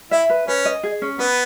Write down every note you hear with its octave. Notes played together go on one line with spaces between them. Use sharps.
E4 E5
B4
C#4 B4
D#5
G#4
C#4
B3 B4